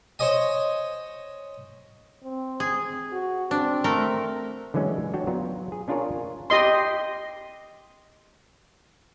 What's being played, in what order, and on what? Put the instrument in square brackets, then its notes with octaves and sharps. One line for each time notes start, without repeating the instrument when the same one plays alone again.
[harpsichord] C5 C#5 D#5 G#5
[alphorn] C4
[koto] G#4
[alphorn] F#4
[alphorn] C4 [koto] D4
[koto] A3 A#4
[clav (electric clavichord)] D3 E3 F#3 G#3 C#4
D4 F#4 C#5 G5
F#3 B3 F4 A#5
G#4
C#4 D4 F4 G#4 A#4 C#5
[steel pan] G4 D#5 C6